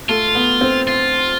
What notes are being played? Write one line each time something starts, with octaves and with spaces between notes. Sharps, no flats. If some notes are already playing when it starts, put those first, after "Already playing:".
A3 F4
B3
C4
F4